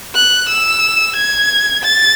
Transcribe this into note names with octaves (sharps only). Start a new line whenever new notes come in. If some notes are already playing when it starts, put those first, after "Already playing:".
F#6
E6
G#6
A6